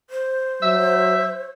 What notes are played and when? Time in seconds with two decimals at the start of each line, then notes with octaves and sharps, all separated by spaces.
0.10 C5
0.62 F#3 E5